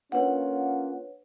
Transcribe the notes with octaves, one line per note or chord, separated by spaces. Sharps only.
A#3 C#4 D4 F4 B4 C#5 F#5